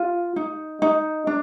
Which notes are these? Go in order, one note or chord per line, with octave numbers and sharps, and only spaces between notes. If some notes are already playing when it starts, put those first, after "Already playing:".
Already playing: F4
D#4
D#4
D4